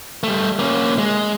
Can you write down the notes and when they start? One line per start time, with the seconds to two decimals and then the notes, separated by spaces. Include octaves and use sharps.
0.23 G3 A3
0.59 A#3 C#4
0.98 G#3